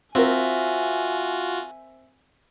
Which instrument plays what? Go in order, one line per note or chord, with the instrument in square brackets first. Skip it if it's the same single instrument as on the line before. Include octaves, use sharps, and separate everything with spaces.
[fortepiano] C4 A#4 [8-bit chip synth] F4 F#4 [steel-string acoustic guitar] E5 [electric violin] G#5